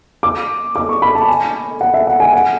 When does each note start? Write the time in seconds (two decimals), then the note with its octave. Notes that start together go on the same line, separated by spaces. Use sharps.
0.23 D6
0.76 D6
0.89 C#6
1.02 B5
1.15 A5
1.28 G#5
1.81 F#5
1.94 E5
2.07 F#5
2.20 G#5
2.33 F#5